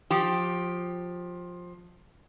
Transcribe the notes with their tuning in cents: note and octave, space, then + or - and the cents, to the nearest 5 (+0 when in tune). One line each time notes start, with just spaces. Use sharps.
F3 +20 G4 +0